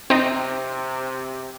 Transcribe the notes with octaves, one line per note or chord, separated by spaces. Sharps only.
C3 C4 D#4